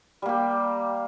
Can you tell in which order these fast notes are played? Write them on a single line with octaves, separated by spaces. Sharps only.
G3 A#3 G4